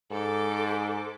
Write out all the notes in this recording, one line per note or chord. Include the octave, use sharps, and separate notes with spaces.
G#2 A4 D6